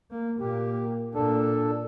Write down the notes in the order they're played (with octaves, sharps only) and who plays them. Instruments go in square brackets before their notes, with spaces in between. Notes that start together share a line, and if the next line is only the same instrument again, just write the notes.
[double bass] A#3
[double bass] A#2 A#3 [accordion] G4
[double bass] A#2 [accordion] D4 A4